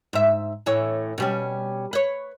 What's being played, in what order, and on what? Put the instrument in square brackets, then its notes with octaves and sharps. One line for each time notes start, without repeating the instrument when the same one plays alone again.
[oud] G#2 E5
A2 E3 C#5
B2 G3 C#4
B4 C#5